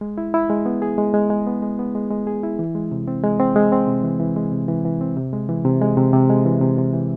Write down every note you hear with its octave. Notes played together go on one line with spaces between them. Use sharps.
G#3
E4
E4
G#3
B3
G#4
G#3
G#3
G#3
B3
G#3
B3
G#3
G#3
G#4
E4
E3
G#3
C3
C4
G#3
C4
G#3
C4
C3
E3
E3
G#3
C3
E3
E3
C4
C3
G#3
E3
C3
G#3
C3
C3
G#3
E3
C3
C3
E3